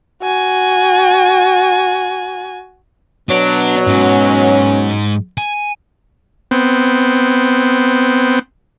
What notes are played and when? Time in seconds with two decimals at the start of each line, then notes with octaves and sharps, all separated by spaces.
0.23 F#4 G#5
3.29 B2 F#3 D4
3.87 G#2 C#4
5.38 G#5
6.51 B3 C4